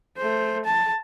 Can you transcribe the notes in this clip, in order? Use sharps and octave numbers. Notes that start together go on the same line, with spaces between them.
A3 C5
A5